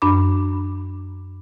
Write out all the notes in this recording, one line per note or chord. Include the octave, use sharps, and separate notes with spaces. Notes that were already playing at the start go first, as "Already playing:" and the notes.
F#2 D4 B5 D6